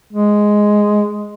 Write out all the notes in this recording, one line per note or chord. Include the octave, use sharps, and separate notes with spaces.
G#3